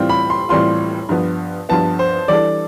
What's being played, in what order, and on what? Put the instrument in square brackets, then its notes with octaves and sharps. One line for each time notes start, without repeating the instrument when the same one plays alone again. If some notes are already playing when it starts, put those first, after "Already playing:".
Already playing: [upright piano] A2 E3 G3 C4 F4
[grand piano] B5
C6
[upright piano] A2 E3 G3 C4 F4 [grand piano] C6
[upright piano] G2 F3 B3
[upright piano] G2 F3 B3 [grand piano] A5
[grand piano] C5
[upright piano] E3 G3 D4 A4 [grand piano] D5